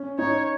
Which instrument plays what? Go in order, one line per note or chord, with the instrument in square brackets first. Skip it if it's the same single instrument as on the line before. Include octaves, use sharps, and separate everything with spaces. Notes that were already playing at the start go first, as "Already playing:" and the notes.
Already playing: [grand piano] C#4
[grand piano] D#4 [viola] C#5